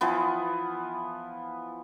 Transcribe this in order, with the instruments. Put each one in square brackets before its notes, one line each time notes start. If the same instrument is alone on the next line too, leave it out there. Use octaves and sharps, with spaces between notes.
[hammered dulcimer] E3 F3 B3